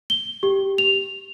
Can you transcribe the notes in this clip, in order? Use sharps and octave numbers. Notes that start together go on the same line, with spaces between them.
G7
G4
F7